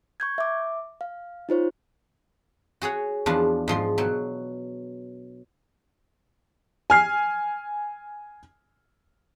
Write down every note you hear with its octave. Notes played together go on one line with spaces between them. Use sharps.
C#6 G6 G#6
E5 D6
F5
D#4 F4 C5 C#5
F#4 G#4 C#5 F#5
E2 F3 D4
G#2 F3 C6
B2 F#3
G#5 F6 C7